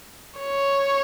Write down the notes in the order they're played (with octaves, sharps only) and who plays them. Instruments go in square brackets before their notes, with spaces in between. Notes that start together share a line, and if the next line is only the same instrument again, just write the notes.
[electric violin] C#5